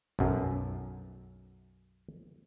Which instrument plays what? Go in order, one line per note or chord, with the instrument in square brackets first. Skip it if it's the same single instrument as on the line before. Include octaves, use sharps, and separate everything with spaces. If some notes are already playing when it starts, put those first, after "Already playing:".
[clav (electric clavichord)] B1 F#2